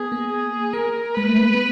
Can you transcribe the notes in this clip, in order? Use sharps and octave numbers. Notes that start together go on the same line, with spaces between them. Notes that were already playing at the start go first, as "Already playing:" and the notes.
Already playing: B3 G#4
A#3
G#4
A#3 A#4
G#3 B4
A3
A#3
B3